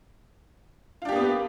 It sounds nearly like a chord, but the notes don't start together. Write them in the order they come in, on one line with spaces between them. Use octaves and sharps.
F4 D4 G4 A#3 B3